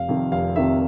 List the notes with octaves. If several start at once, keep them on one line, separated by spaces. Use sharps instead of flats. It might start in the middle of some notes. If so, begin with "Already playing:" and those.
Already playing: F1 F5
F2 C3 D#3
F1 F5
F2 C3 D#3 E5